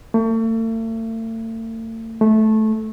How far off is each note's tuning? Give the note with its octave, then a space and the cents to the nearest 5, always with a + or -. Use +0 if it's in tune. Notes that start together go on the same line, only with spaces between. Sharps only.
A3 +40
A3 -15